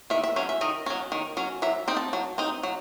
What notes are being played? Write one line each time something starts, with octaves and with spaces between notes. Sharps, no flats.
D#3 E5
E5
F#3 C#4
E5
D#3 D#5
F#3 C#4
D#3
F#3 C#4
F#3 E5
C4 D#4
A5
F#3
C4 D#4
F#3